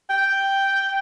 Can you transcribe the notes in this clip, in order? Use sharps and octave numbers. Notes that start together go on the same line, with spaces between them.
G5